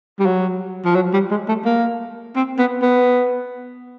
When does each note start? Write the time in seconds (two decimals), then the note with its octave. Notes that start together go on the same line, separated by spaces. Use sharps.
0.19 G3
0.26 F#3
0.85 F3
0.95 F#3
1.13 G3
1.31 G#3
1.48 A3
1.65 A#3
2.36 C4
2.59 B3
2.82 B3